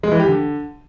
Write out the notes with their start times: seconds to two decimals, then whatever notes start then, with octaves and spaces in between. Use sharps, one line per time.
0.03 G#3
0.12 E3
0.20 G4
0.28 D3